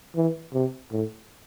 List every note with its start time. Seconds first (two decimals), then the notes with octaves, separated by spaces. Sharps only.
0.16 E3
0.54 C3
0.92 A2